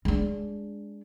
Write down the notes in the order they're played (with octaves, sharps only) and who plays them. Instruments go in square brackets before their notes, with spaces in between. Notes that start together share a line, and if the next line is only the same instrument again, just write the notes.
[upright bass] G#3 D4